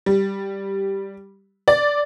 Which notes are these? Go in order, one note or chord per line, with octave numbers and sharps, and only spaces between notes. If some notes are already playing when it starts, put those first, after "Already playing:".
G3
D5